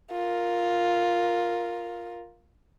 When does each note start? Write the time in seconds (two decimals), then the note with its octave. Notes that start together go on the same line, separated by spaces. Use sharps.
0.11 F4 A#4